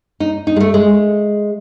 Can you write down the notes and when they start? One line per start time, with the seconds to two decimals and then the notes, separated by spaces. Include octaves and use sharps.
0.20 D#4
0.47 D#4
0.56 G#3
0.60 A3
0.74 G#3